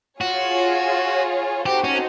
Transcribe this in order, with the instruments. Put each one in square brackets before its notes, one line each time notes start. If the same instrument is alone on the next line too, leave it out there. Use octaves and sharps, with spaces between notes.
[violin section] F4 G#4 C#5 [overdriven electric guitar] F#4
[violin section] C4 D#4 F#4 A4 C5 [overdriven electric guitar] G4
[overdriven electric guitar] C#4